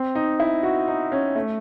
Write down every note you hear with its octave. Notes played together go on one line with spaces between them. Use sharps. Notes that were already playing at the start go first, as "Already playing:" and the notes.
Already playing: C4
D#4
E4
F#4
D#4
C#4
A3